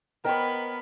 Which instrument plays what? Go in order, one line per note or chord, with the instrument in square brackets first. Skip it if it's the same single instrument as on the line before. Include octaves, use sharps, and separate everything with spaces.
[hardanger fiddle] B3 B5 [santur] A#4 C#5 [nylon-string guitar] C5 D#5 G5